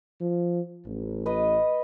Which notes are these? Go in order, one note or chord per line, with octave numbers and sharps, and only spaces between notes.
F3
A1
B4 D#5